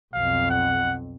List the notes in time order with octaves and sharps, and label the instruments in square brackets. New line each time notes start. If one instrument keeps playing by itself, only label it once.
[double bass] B1 F2 [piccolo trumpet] F5
[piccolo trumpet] F#5